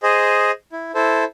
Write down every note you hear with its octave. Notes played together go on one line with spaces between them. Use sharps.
G#4 C5 D#5
E4
E4 A4 C5